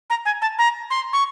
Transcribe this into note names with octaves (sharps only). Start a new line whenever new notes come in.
A#5
G#5
A5
A#5
C6
C#6